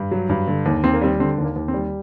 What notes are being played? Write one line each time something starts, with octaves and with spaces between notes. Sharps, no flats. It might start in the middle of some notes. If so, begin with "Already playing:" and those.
Already playing: G2
F#3
G2
D3
D#2
D#2 C4
A#3
G3 C4
D3 C4
D#2
A#3
D#2
C4
G3